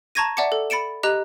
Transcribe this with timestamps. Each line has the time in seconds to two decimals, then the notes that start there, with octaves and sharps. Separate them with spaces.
0.15 A5 A#5 C#6 G#6 A#6 D#7
0.37 D5 E5 F#5 A5 D6 C#7
0.52 A4
0.70 B5 A6 C#7 D7 E7
1.03 G4 D#5 A#5 F#6